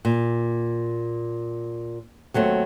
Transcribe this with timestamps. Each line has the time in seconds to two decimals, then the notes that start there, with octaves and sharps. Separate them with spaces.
0.05 A#2
2.34 D#2 F#3 A3 C4